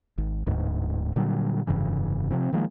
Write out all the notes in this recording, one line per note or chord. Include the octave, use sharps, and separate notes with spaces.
G#1
D1 D2 G#2
A#2 D3 F#3 G3
F1 G2 C#3 E3
C3 F3 C4
D#3 F3 G#3 A#3